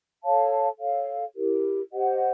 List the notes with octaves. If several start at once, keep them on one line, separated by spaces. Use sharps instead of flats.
A4 C#5 F5 A5
A4 C#5 F5
E4 G4 A#4
G4 C5 D#5 F#5